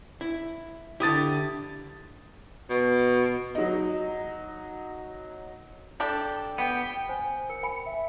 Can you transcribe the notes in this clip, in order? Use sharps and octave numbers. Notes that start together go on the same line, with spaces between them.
E4
D3 E4 G4 D#6 A6
B2
F#3 D#4
G3 D4 G4 A4
B3 G5
C5 G#5
A#4 C#7
G5 G#5 B5
E5